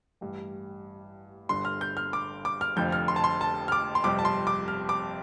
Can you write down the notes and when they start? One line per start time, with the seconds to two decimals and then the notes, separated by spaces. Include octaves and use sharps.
0.21 A1 G2 G3
1.49 G1 G2 D3 C6
1.65 F6
1.81 G6
1.97 F6
2.13 D6
2.45 D6
2.61 F6
2.76 F1 F2 D3 F3 G6
2.92 F6
3.08 C6
3.16 A5
3.24 C6
3.41 A5
3.68 F6
3.72 D6
3.95 C6
4.04 G1 F2 C3 G3 C4 D6
4.19 A5
4.25 C6
4.47 D6
4.68 F6
4.89 D6